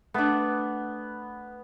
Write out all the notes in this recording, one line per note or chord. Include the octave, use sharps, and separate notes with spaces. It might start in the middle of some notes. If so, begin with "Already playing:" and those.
A3 B3 D4